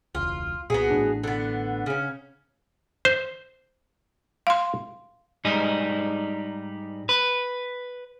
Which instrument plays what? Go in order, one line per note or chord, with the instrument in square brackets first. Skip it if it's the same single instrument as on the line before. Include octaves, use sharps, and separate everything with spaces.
[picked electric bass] E1 C#2 [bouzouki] F4
[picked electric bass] C2 A#2 [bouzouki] B3 F#4 G#4
[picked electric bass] A1 A2 D4
[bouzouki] D3 B3
C#3 C#4
[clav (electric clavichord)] C5
[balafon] F5 C6
[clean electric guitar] G#2 G3 D#4
B4